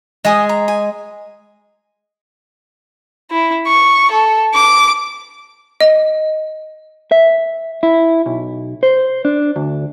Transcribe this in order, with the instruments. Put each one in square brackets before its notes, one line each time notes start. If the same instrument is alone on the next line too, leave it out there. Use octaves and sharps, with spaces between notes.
[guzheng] G#3 G#4 [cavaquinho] D#5 G#5 D#6
[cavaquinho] A#5
G#5
[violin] E4
C#6
A4
D6
[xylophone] D#5
[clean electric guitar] E5
E4
B1
C5
D4
D2